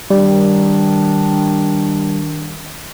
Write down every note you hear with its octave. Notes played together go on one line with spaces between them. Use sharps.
D#3 G3 D4